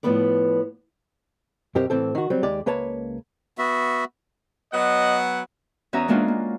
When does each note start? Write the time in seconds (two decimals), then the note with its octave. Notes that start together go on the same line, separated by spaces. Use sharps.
0.03 A2 F3 A#3 B3 B4 D5
1.75 F#2 B2 C4 G4 A#4
1.90 A2 E3 C4 A4
2.15 D#3 F#4
2.30 F#3 G3 C4
2.43 D#2 G#3 G4 D5
2.66 C#2 A#3 B4 C#5 A5
3.58 B3 F#4 E5
4.74 F#3 B3 D#5 F#5
5.93 E2 C#4 F#4 E5 A#5 D#6
6.08 G#3 A#3 C#4 D4 F4 F#4
6.28 A#3